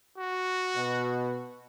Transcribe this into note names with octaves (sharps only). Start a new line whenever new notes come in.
F#4
B2